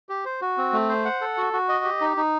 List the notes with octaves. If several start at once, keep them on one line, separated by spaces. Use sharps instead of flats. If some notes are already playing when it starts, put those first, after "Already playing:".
G4
C5
F#4
C4
A3
C5
F#5
A4
F#4
F#4
D#5
G4
D#4
D#4